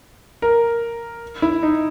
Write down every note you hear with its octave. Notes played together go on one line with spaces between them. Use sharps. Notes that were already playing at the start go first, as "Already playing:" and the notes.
A#4
E4
D#4